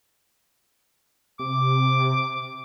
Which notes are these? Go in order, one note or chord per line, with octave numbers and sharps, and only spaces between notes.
C3 D6